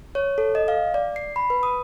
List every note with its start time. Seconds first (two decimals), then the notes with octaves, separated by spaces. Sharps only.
0.15 C#5
0.38 A4
0.55 D#5
0.68 F5
0.94 D5
1.16 C7
1.36 B5
1.50 B4
1.63 D#6